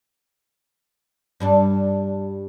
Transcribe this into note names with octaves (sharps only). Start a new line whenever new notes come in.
G2 G3 D4